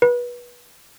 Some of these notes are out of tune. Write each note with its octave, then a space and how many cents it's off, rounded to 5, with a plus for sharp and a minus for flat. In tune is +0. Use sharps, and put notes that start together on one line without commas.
B4 -25